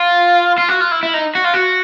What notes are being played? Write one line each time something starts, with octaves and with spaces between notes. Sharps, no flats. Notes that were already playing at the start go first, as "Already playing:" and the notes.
Already playing: F4
F4
F#4
F4
E4
E4
D#4
F#4
F4
F#4